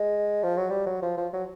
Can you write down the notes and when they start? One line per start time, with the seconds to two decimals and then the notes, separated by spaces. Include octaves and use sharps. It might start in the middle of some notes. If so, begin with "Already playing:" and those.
Already playing: G#3
0.43 F3
0.57 F#3
0.70 G3
0.86 F#3
1.02 F3
1.17 F3
1.33 F#3